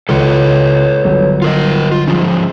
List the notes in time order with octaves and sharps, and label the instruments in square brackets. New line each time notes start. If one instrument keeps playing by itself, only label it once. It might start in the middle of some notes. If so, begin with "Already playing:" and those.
[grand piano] C#2 C6 C#7 [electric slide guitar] A4 B4 C#5
[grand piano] G1 F#3 B3
[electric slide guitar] F4 A#4 D#5
F4
F3 G#3 C#4